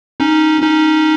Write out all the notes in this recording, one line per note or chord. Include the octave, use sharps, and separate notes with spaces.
C#4 D#4
C#4 D#4